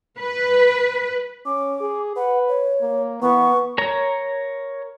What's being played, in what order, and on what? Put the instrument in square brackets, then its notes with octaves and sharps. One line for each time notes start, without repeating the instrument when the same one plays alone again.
[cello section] B4
[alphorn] C#4 [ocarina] D6
[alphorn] G#4
[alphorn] B4 [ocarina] F#5
[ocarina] C#5
[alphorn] A#3
[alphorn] E3 [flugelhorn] B3 [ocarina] C#6
[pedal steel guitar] A#4 C#5 A#5